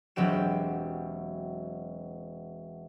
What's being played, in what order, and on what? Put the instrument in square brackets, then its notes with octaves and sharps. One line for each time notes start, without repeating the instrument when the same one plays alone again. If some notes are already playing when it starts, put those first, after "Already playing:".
[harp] E1 F#3 C4 G4 E7